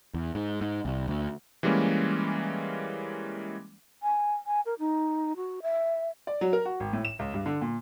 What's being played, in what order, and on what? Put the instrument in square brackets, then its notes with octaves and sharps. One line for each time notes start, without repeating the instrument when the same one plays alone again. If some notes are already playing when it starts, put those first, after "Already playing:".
[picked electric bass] E2
G#2
G#2
C2
D2
[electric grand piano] E3 G3 G#3 A#3 C#4
[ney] G#5
G#5
A#4
D#4
F#4
E5
[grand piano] D5
F#3
A#4
F#4
G#1
A2
E7
C#2
G2
D3
A#2